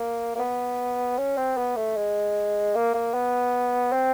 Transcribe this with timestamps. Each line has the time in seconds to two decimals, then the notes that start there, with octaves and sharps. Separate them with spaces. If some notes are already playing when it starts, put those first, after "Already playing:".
Already playing: A#3
0.36 A#3
0.39 B3
1.18 C#4
1.37 C4
1.57 B3
1.76 A3
1.97 G#3
2.75 A#3
2.94 A#3
3.14 B3
3.93 C4